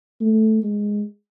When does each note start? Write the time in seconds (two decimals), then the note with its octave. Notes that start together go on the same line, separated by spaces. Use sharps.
0.20 A3
0.63 G#3